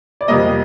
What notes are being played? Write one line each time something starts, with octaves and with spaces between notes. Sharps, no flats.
D5
F2 C3 G3 A#3 D#5